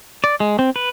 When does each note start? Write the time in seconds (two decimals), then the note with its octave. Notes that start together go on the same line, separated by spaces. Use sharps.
0.24 D5
0.40 G#3
0.59 C4
0.76 B4